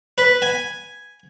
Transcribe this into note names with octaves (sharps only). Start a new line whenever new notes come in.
B4
G#5